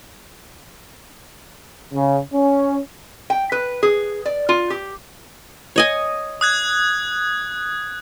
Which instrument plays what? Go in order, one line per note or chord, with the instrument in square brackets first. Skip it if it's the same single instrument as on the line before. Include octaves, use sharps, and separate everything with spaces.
[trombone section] C#3
C#4
[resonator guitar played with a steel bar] G5
B4
G#4
D5
F4
G4
[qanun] C#5 D#5 G#5
[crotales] D#6 F#6 G#6